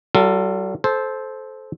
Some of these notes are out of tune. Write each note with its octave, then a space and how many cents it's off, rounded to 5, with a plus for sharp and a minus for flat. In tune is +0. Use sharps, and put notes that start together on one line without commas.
G3 -45 F4 +0 A4 +25
A4 -20 C5 +0